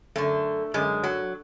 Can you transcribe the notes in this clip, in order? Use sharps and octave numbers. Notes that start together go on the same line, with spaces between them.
F#2 D3 A3
F#2 D3 G#3
F#3